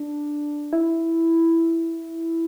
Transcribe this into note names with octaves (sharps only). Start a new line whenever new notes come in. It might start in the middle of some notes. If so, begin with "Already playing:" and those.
Already playing: D4
E4